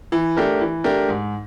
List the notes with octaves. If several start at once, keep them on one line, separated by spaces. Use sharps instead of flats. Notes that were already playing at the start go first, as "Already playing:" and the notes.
E3
A3 D4 G4 A#4
E3
A3 D4 G4 A#4
G#2